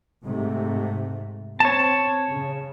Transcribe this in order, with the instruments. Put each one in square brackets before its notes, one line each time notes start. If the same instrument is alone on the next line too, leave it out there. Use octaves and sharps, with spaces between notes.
[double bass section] G#2 C3 A3
[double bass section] C4 [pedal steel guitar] C#5 A5
[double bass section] C#3